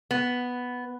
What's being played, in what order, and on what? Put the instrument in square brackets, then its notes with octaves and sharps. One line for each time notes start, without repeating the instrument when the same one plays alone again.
[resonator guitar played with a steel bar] B3